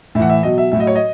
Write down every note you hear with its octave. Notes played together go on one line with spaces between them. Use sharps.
A2 E3 E5 F#5
E5
B2 F#3 D#5
E5
A2 F#3 E5
D#5
C#5
D#5